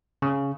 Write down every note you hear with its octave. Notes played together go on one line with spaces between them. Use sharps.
C#3